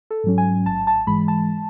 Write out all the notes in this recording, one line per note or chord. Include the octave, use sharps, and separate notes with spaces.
A4
G#2 F#3 C#4
G#5
A1 A5
A5
G#2 E3 G#3 B5
A5